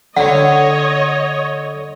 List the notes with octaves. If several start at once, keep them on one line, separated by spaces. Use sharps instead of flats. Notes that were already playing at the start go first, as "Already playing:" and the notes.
D3 C#5 D#5 F#5